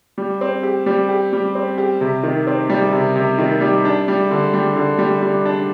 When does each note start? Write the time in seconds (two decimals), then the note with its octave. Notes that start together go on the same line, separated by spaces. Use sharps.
0.18 G3
0.41 C4
0.63 G4
0.86 G3
1.09 G4
1.33 G3
1.55 C4
1.78 G4
2.01 C3
2.23 D#3
2.47 C4
2.70 G3
2.93 C3
3.16 C3
3.38 D#3
3.61 G3
3.85 D4
4.08 G3
4.31 D3
4.54 G3
4.76 D3
4.98 G3
5.22 G3
5.45 D4